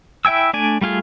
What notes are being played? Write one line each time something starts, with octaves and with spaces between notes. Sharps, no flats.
E4 E5 G5 G#5 E6
A3 D4 D5 G#5
G3 A3 F4 G#4